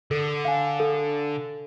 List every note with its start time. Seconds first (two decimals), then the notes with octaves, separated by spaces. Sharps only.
0.11 D3 A4
0.45 F5 G#5
0.80 A4